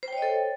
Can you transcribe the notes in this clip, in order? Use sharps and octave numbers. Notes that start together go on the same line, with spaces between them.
A4 C5 C#5 D#5 G5